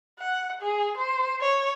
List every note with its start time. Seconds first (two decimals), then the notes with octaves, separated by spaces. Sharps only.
0.19 F#5
0.61 G#4
0.97 C5
1.41 C#5